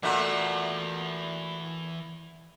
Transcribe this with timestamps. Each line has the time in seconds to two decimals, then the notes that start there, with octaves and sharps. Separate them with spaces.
0.03 A#2 E3 A3 F#4 F#5